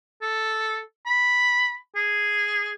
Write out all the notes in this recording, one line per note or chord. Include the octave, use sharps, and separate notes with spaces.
A4
B5
G#4